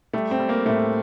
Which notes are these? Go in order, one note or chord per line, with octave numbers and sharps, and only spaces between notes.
G3 A3
C4
G3
A#3
A2 A3